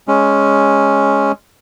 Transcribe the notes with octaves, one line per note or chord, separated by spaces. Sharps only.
G#3 C#4